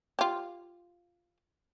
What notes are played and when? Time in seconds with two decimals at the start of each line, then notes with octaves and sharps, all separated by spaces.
0.19 F4 G4